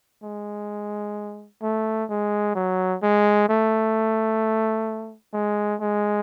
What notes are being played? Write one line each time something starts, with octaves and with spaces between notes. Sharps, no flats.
G#3
A3
G#3
F#3
G#3
A3
G#3
G#3